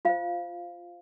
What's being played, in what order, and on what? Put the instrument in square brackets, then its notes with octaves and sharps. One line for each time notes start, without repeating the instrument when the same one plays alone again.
[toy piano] F4 C5 F5